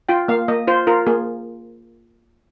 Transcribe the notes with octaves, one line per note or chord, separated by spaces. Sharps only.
F4 G5
A#3 F5
A#3 D#5
F4 C5
F4 A#4
A#3 G#4